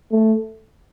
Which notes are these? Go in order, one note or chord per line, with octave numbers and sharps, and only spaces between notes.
A3